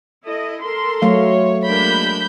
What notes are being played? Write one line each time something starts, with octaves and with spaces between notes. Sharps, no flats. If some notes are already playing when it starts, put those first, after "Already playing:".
E4 A4 D#5
A4 A#4 C6
F#3 A3 C#5 F5
G#3 A#3 D4 B5 G6